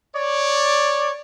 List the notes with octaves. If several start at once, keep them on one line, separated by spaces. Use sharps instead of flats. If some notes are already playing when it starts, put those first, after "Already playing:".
C#5 D5